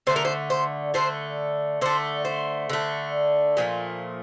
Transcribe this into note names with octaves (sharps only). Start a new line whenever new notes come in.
D3 A3 C5
A#4
C5
C5
D3 A3 C5
D3 A3 C5
C5
D3 A3
A#2 F3 A3